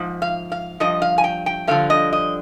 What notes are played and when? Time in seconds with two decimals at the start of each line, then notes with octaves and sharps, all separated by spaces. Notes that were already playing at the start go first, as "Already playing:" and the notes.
Already playing: G#2 F3
0.22 F5
0.52 F5
0.80 G2 F3 D#5
1.02 F5
1.18 G#5
1.24 G5
1.46 G5
1.67 G2 D3 F3 F5
1.90 D#5
2.13 D#5